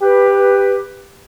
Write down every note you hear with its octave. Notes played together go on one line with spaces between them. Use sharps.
G4 B4